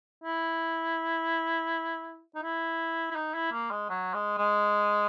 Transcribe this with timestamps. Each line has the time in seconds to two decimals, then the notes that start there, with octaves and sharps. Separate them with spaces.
0.24 E4
2.35 D#4
2.43 E4
3.11 E4
3.16 D#4
3.34 E4
3.52 A#3
3.71 G#3
3.90 F#3
4.14 G#3
4.38 G#3